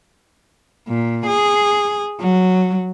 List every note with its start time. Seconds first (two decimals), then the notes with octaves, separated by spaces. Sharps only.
0.88 A#2
1.27 G#4
2.20 F#3